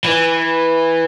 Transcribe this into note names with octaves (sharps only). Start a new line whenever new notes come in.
E3